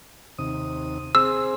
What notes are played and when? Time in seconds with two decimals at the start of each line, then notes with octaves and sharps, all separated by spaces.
0.39 D#2 C3 D#6
1.15 C4 G#4 C5 E6